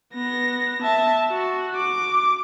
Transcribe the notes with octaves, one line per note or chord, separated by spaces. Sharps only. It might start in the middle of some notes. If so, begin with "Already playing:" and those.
B3 A#6
E5 A5
F#4
D6